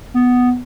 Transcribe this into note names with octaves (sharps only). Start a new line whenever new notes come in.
B3